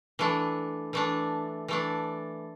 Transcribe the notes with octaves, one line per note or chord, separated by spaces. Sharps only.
E3 A3 D4
E3 A3 D4
E3 A3 D4